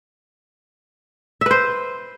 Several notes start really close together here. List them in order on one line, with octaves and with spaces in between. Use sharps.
E5 B4 C5